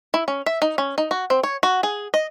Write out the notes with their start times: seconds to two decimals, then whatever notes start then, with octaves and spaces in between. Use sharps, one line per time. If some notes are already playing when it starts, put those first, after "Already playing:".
0.14 E4
0.28 C#4
0.46 E5
0.62 D#4
0.78 C#4
0.98 D#4
1.11 F#4
1.30 C4
1.43 C#5
1.63 F#4
1.83 G#4
2.14 D#5